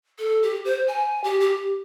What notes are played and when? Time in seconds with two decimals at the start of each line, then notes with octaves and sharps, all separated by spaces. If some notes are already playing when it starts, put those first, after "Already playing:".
0.19 A4
0.42 G4
0.65 C5
0.88 G#5
1.24 G4
1.40 G4